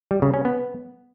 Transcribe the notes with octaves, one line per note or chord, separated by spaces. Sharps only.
G3
C#3
C#4
B3